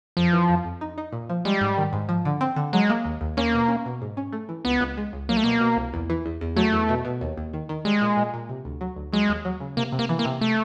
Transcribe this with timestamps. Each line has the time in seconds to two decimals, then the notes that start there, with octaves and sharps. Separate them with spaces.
0.17 F2 F3
0.33 E3
0.49 F2
0.65 F2
0.81 D#4
0.98 D#4
1.12 A#2
1.29 F3
1.45 G3 G#3
1.61 G#2
1.78 D#3
1.93 G#2
2.09 F3
2.25 D3
2.41 C4
2.56 D3
2.73 F#3 G#3
2.90 A#3
3.04 D#2
3.21 D#2
3.37 A#3 C#4
3.54 B2
3.68 C#4
3.86 B2
4.02 G#2
4.17 C#4
4.33 A3
4.49 E3
4.65 C#2 B3
4.81 C#2
4.97 G#3
5.13 C#2
5.29 F#3 A#3
5.37 A3
5.44 B2 A#3
5.60 B2
5.77 C2
5.94 E2
6.10 E3
6.26 E2
6.41 E2
6.56 F#3 A3
6.73 E2
6.89 B2
7.05 B2
7.21 D#2
7.38 D#2
7.54 D#3
7.69 D#3
7.85 G3 G#3
8.01 A#2
8.17 A#2
8.34 A#2
8.49 C3
8.65 D2
8.81 F#3
8.96 D2
9.12 F#3 G#3
9.28 D#2
9.45 F#3
9.60 C#3
9.77 C3 A#3
9.92 C3
9.99 A#3
10.09 E3
10.19 A#3
10.25 C3
10.41 A3